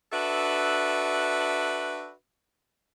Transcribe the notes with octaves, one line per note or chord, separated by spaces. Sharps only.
D4 F#4 A4 B4 E5